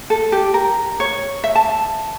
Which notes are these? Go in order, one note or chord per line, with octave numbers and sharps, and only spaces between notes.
A4
G4
A#4
C#5
E5
A5